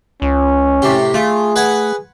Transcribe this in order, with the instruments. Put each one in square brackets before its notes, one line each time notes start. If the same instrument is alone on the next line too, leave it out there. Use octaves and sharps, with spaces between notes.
[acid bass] C#2 [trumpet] C#4
[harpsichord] A2 C3 G4
[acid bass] A3 [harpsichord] F4 [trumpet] G#4
[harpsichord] B4 F#5 G#5